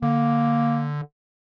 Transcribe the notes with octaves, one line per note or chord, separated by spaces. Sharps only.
D3 A#3